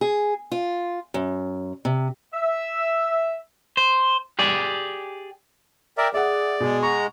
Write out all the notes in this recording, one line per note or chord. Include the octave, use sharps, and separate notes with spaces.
G#4
F4
F#2
C3
E5
C5
G4 G#4 D5
A#4 D5 E5 G5
G#4 D5 E5 F#5
B2 G#3
F#5 A#5 C#6